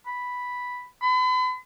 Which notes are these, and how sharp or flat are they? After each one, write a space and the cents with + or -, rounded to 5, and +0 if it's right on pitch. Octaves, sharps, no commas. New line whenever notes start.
B5 +0
B5 +40